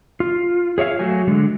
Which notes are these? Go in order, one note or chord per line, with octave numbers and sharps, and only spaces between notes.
F4
G#4 C#5 E5 F5
F#3 A3 F#4 G#5
D3 G#3